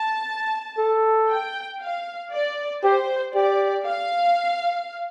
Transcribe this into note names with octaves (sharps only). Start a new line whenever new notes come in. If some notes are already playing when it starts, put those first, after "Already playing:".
Already playing: A5
A4
G5
F5
D5
G4 C5
G4 D5
F5